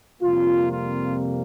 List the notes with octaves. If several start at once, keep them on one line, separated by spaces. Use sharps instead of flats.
F2 C3 G3 A#3 F4
F4